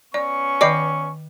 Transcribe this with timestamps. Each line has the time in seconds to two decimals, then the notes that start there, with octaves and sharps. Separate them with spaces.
0.14 B3 C#4 D5 C#6
0.61 D#3 D5 D#5 G5 D6 C7